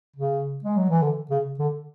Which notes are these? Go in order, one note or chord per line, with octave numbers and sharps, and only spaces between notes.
C#3
G#3
F#3
E3
D3
C#3
D3